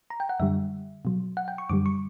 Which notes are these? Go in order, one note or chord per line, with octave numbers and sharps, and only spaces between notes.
A#5
G5
F#5
F#2 D3 G3 E5
B2 F#3
F#5
G5
C#6
F#2 D3 G3 D6
C#6